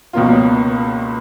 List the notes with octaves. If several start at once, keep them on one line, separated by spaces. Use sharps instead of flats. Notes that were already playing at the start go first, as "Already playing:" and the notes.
C#2 B2 A#3 C#4 F4